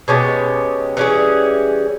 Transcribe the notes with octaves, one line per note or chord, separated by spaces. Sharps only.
B2 G#3 C#4 G4
E3 G3 C#4 G#4